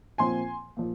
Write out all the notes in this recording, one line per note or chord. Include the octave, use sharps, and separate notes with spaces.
A#2 F3 C4 G#5 C6
A#2 F3